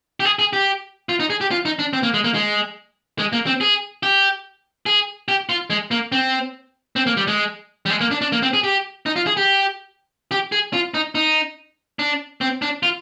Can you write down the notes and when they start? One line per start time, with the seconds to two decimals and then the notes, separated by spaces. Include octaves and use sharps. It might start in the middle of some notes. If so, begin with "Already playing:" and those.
0.20 G4
0.25 G#4
0.39 G#4
0.53 G4
1.09 F4
1.20 D#4
1.30 G#4
1.41 G4
1.51 F4
1.65 D#4
1.79 D4
1.93 C4
2.03 A#3
2.14 G#3
2.24 A#3
2.35 G#3
3.19 G#3
3.33 A#3
3.47 C4
3.61 G#4
4.03 G4
4.86 G#4
5.28 G4
5.49 F4
5.70 G#3
5.91 A#3
6.12 C4
6.96 C4
7.07 A#3
7.17 G3
7.27 G#3
7.86 G3
7.90 G#3
8.01 A#3
8.11 D4
8.21 D4
8.32 A#3
8.42 C4
8.54 G#4
8.64 G4
9.06 D#4
9.16 F4
9.27 G#4
9.37 G4
10.31 G4
10.52 G#4
10.73 F4
10.94 D#4
11.15 D#4
11.99 D4
12.41 C4
12.62 D4
12.83 F4